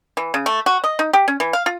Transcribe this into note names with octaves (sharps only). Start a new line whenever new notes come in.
E3
C#3
A3
F#4
D#5
D#4
G4
C#4
E3
F5
F4